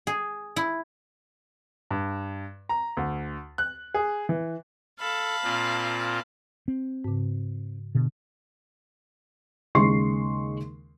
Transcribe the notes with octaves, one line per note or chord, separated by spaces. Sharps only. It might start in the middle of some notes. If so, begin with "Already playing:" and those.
G#4
E4
G2
A#5
D2
F#6
G#4
E3
A4 F5 A5 B5
A#2 C4 F4
C4
G#2 C#3
B2 D3
D#2 C#3 G#3 C6 C#6 C7